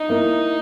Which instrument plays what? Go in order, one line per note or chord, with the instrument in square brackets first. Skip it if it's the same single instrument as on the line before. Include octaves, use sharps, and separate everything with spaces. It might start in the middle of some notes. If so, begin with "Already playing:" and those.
Already playing: [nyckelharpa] D#4
[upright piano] A#3 E4